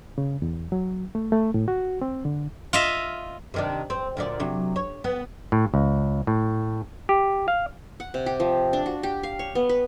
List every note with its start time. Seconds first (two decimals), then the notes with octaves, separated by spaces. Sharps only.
0.18 C#3
0.42 E2
0.72 F#3
1.15 A3
1.32 A3
1.54 A2
1.68 F#4
2.02 C4
2.25 D3
2.73 F4 D#5 E5
3.54 C3 D#3 D4
3.90 C4
4.17 D2 A#2 D5
4.40 C3 F#3
4.76 C#5
5.04 B3
5.52 A2
5.74 C#2
6.27 A2
7.09 G4
7.48 F5
8.00 F#5
8.14 C3
8.26 G4
8.40 F3
8.73 D4
8.86 F#4
9.03 G4
9.23 F5
9.39 C#5
9.55 B3
9.69 B4